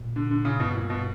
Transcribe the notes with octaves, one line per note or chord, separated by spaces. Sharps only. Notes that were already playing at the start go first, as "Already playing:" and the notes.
Already playing: A#2
D3
D3
C#3
G2 B2
A#2
B2